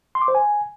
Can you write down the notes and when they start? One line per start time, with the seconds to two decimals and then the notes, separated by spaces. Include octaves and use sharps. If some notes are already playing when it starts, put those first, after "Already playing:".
0.15 C6
0.22 D6
0.28 C5
0.35 G#5